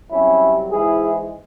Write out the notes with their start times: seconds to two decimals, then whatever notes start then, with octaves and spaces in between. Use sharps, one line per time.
0.11 C2 C3 F#3 C4 C#4 E4
0.70 G#2 E3 G#3 E4 G#4